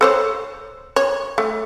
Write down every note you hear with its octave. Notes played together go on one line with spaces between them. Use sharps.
A4 C5 C#5
C#5
A3